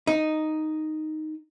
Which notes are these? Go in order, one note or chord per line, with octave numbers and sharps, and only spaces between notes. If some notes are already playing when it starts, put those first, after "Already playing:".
D#4